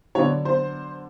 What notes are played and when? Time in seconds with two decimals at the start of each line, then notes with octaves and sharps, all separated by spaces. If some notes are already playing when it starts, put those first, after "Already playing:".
0.15 D3 F#3 B3 D4 C#5
0.45 C5